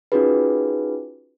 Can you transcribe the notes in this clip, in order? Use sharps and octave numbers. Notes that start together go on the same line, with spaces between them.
C#4 D#4 F4 F#4 G#4 B4